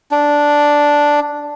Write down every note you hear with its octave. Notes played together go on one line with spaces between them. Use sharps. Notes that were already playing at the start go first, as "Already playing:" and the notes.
D4